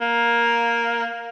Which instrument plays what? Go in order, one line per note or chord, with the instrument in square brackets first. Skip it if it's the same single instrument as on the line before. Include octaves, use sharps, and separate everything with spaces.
[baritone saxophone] A#3